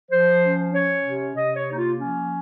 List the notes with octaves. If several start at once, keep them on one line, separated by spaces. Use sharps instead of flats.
F3 C5
C#4
C#4 C#5
C3
C3 D#5
C#5
A#3 D#4
F4
F3 C#4